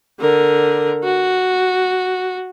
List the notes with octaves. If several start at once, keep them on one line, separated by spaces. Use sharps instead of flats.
D3 A#4
F#4